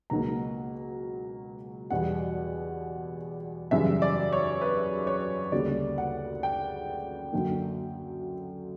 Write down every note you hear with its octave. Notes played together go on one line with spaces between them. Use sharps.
C#2 B2 F#3 A#3 A#5
E2 B2 G3 F#5
F#2 C#3 E3 G3 E5
D5
C#5
B4
C#5
D2 C#3 G3 A#3 D5
F#5
G5
F#2 D3 F#3 A#3